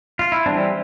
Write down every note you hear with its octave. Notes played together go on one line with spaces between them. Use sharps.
F4
E4
E3 G3 C4 D4